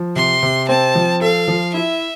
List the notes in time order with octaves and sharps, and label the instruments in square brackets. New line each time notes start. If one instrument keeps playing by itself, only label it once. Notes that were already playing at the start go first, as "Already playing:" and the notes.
Already playing: [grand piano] F3
[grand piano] C3 [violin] C6
[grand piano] C3
[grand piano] C4 [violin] A5
[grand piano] F3
[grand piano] A4 [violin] F5
[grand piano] F3
[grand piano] E4 [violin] E5